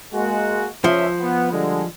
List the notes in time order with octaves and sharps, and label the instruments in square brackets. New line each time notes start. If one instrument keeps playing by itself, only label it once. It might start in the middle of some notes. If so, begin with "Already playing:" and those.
[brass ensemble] G#3 A#3 F#4
[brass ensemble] C#2 C#4 E5 [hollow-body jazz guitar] F3
[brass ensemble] B3
D3 G3 G#3